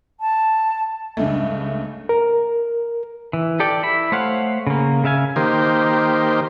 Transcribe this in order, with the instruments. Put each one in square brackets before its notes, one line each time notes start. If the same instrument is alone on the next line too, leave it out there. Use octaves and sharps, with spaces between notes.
[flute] A5
[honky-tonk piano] C#2 G2 A3
[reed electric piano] A#4
[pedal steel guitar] E3
G4 A4 D5 G5
E4 B5
A3 C5 C#5 F5 F#5
C#3 A#3
C#3 E5 F5 G#5
[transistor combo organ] D#3 A#3 G4 C5